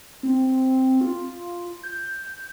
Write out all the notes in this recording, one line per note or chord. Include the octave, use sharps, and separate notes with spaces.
C4
F4
G6